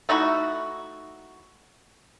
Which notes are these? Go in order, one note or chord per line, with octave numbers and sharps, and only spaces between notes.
A3 D#4 E4 F#4